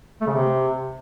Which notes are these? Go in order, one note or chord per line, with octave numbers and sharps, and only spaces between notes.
A3
C#3
C3